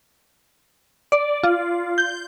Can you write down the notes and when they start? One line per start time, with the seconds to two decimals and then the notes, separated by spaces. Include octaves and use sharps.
1.12 D5
1.43 F4
1.98 G6